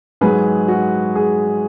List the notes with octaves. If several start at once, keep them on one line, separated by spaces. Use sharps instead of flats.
G#2 F#3 G#4 B4
F#4
G#4